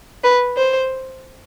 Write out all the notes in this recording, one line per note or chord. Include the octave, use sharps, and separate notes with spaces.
B4
C5